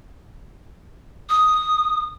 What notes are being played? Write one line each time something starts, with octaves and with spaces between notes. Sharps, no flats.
D#6